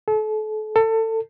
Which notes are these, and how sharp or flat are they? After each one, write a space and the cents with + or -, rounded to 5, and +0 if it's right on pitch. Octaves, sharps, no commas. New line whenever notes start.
A4 -35
A4 +25